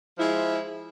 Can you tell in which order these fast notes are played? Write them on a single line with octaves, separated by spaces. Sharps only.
F3 E4 G#3